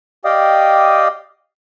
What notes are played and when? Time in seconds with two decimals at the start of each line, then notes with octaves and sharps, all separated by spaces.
0.25 G4 D5 D#5 F5 G5 D#6